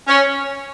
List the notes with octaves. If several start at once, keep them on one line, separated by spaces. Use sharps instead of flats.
C#4